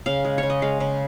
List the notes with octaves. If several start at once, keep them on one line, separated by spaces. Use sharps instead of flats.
C#3 F5
G#3
C#3 C#5
D#5
G#3 F5
C#3